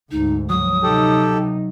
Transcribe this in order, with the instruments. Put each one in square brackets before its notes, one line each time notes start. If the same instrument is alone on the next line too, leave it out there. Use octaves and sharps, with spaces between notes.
[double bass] D2 G#2 [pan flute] D#4
[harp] F#3 [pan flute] D#6
[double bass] C3 D#4 [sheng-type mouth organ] G4 A4